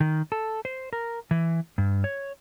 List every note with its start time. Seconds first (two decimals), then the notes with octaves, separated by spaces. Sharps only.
0.01 D#3
0.32 A4
0.65 C5
0.93 A#4
1.31 E3
1.78 G2
2.04 C#5